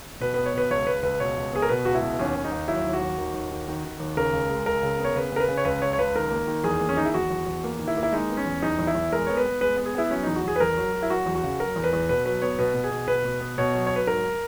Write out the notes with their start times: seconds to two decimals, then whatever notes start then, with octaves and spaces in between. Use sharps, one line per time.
0.20 B2 B4
0.34 B3 B4
0.46 C#5
0.54 B2 B4
0.70 C#2 C#5
0.87 C#2 B4
1.03 C#2 B4
1.20 B2 C#5
1.37 C#2
1.52 B3 G#4
1.62 A#4
1.69 B2 B4
1.85 C#2 F#4
1.95 E4
2.02 B2
2.19 D#2 C#4
2.35 D#2
2.44 D#4
2.52 D#2
2.68 F#3 E4
2.85 D#2
2.93 F#4
3.02 D#2
3.18 D#3
3.34 D#2
3.51 D#3
3.68 D#3
3.85 D#3
4.00 D#2
4.17 C#3 A#4
4.33 C#2
4.49 G#3
4.66 C#2 A#4
4.83 C#3
4.99 B3
5.05 C#5
5.16 C#3 B4
5.32 C#3 A#4
5.40 B4
5.48 C#3
5.57 C#5
5.65 C#2 B4
5.82 C#3 C#5
5.93 C#5
5.98 C#2 B4
6.16 D#3 A#4
6.31 A#3
6.47 D#3
6.64 E2 G#4
6.80 A#3
6.89 C#4
6.97 D#3 D#4
7.05 E4
7.14 E2 F#4
7.31 E2
7.47 E2
7.64 A#3
7.79 D#3
7.88 E4
7.97 A#3
8.03 E4
8.12 G#3 D#4
8.30 B3
8.37 C#4
8.46 E2
8.62 E2 D#4
8.79 E2
8.87 E4
8.95 E2
9.12 G#3 A#4
9.27 B3 C#5
9.37 B4
9.45 B3
9.61 G#3 B4
9.77 B3
9.86 G#4
9.95 B3 E4
10.10 F#3 C#4
10.23 E2 D#4
10.36 F#4
10.44 E2 G#4
10.56 B4
10.60 E2 A#4
10.77 F#3
10.93 F#3
11.03 E4
11.10 F#3 F#4
11.26 E2
11.35 F#4
11.44 C#3
11.60 F#3 A#4
11.76 E2
11.84 B4
11.93 E2
12.09 B2 B4
12.25 F#3 B4
12.42 B3 C#5
12.59 B2 B4
12.75 B2
12.84 G#4
12.91 B2
13.08 B2 B4
13.25 B2
13.41 B3
13.58 B2 C#5
13.74 F#3
13.87 F#3 C#5
13.96 B4
14.07 G#2 A#4